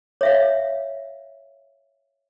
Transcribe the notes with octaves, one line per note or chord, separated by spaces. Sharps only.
C#5 E5 F5